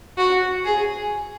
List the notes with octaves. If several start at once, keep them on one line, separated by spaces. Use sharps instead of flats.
F#4
G#4